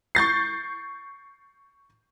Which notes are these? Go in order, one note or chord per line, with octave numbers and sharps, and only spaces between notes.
C#6 G6 A6 C7